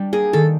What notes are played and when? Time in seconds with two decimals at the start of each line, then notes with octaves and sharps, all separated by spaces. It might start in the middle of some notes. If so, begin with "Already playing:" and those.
Already playing: G3 D4
0.13 A#3 G#4
0.33 D#3 A4